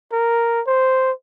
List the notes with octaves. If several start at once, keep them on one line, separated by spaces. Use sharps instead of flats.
A#4
C5